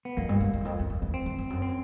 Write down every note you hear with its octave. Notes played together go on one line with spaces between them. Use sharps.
B3
F2 A#3
G2
G2
F2
E2
F2
F2
E2
E2
C4
F2
F2
F#2
C4